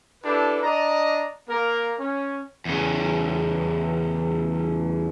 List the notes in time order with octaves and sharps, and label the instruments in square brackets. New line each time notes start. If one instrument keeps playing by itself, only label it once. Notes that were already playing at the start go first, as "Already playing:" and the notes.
[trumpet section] D4 E4 G4 A4 B4
D4 D5 D#5 A#5
A#3 A#4
C#4
[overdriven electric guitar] E2 C#3